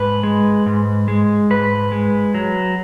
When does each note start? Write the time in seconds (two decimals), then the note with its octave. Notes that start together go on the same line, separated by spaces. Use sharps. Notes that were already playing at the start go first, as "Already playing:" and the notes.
Already playing: G#2 B4
0.23 G#3
0.66 G#2
1.08 G#3
1.50 G#2 B4
1.92 G#3
2.34 F#3